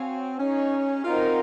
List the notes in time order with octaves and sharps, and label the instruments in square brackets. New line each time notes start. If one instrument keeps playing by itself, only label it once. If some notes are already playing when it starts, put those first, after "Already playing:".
Already playing: [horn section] C4 [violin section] F#4 C#5 F5 G#5
[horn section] C#4 [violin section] D#4 G#4 C#5
[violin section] C4 D#4 F#4 A#4 [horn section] F4